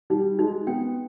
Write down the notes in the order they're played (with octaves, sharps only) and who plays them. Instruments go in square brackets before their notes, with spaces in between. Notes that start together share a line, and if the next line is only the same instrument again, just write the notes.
[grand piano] G3 [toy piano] D#4
[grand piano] G#3 [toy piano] D#4
[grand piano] B3 [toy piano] G5